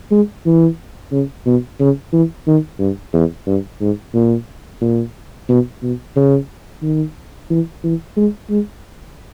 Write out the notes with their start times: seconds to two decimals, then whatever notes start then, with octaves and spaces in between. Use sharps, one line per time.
0.11 G#3
0.46 E3
1.12 C#3
1.46 B2
1.80 C#3
2.13 E3
2.47 D#3
2.79 G2
3.13 E2
3.47 G2
3.81 G#2
4.14 A#2
4.81 A#2
5.49 B2
5.83 B2
6.16 C#3
6.82 D#3
7.50 E3
7.84 E3
8.17 G#3
8.50 G#3